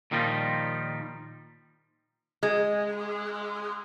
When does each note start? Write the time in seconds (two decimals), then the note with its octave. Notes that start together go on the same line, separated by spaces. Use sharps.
0.11 A#2 D#3 F3 G3 C#4 D#4
2.43 G#3